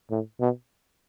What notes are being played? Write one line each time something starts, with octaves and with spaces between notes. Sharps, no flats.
A2
B2